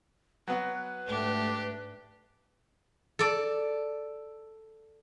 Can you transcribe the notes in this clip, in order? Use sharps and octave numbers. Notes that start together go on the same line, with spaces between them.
F#3 B3 F#4 B4
G#2 A3 D4 G4
A4 D5